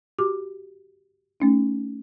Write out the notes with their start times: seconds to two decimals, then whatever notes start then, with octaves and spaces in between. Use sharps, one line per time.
0.19 F#4 G4 D6
1.40 A3 C#4 D#4